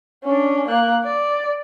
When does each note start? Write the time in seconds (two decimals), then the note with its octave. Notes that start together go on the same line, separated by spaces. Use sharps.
0.24 C#4 D4
0.68 A#3 F#6
1.04 D5